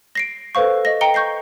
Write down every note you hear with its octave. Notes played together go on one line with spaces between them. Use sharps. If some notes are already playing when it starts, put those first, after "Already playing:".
A#6 C7 D7
A4 B4 C5 F5 C#6
D#5 A#6
D#5 G5 A#5 C#7 G7
C#6 G6 A#6 C7